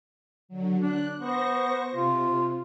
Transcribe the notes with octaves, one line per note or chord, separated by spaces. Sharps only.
D3 F#3
D4 F#6
B3 C5 C#6 A#6
C3 F4